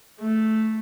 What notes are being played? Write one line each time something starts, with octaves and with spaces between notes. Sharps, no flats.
A3